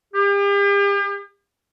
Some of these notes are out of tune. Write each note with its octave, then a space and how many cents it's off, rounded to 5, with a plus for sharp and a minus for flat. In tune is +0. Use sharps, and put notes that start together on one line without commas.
G4 +40